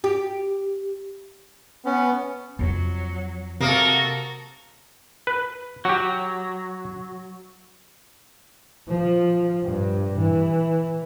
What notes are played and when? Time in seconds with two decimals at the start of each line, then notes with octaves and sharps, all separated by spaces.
0.04 G4
1.86 B3 C#4
2.59 F2 F3 F#3
3.61 C3 A#3 F#4 A4 D#6
5.27 B4
5.85 F#3 F#4 G4
8.88 F3
9.64 G2
10.19 E3